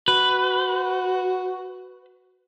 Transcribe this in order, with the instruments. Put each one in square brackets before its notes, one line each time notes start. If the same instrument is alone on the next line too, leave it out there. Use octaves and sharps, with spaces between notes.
[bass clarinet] F#4 [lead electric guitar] B4